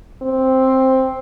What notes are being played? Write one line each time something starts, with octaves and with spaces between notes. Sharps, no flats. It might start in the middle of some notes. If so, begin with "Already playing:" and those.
C4